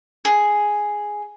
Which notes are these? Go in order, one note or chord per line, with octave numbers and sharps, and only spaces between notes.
G#4